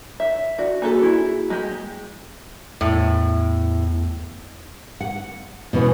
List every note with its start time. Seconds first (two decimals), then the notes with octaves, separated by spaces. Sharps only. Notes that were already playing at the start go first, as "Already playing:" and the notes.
0.20 E5
0.59 F#4 D5
0.82 A#3 F#4 G#4 A4 B4 G#5
1.03 E4
1.50 G#3 G4
2.81 E2 A2
5.01 F#5
5.73 B2 E3 B3 C#4